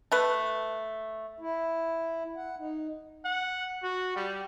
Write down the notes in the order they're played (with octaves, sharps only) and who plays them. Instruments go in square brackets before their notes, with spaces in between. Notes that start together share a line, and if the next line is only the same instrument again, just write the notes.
[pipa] A3 B4
[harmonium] E4
F#5
D#4
[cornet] F#5
F#4
G3